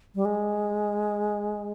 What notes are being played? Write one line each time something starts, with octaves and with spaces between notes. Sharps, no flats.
G3
G#3